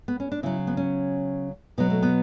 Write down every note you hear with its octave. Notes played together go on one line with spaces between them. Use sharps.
B3
C#4
D4
C#3 F#3 E4
B3
C#4
B2 F#3 B3
A3
B3